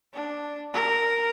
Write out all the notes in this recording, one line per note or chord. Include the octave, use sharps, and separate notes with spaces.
D4
A#4